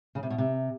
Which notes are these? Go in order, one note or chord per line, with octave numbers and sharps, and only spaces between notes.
C#3
C3
B2
C3